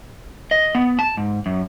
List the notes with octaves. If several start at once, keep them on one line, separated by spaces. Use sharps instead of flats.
D#5
B3
A5
G#2
F#2